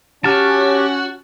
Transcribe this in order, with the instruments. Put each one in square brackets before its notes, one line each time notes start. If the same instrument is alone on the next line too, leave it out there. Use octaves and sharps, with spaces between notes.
[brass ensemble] C#4 [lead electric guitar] F#4 [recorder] G4 [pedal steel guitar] A5 F6